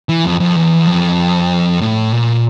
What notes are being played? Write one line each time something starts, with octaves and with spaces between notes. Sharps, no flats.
E3
F2
F2
E2
F2
A2
A#2